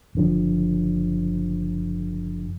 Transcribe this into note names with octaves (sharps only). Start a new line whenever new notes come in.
F#1 D3 F3